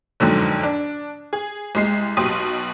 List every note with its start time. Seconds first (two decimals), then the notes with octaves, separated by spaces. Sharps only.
0.20 F#1 F2 G#2 D3 F#3
0.63 D4
1.33 G#4
1.75 C2 G#3 C7
2.17 B1 B2 G4 C6 D#6 D#7